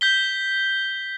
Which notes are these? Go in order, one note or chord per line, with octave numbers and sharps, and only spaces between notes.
G6 B6 G7